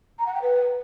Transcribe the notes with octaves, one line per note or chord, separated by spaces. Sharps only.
A#5
F#5
G5
B4